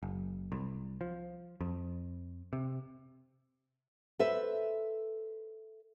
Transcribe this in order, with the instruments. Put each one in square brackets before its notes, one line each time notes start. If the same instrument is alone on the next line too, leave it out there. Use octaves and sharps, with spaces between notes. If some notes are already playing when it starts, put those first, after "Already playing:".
[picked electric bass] F#1
C2
F3
F2
C3
[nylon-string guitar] A4 B4 C5 E5